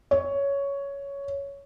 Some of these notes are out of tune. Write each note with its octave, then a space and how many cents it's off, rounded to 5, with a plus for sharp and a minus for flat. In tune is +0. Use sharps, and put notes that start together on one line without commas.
C#5 +10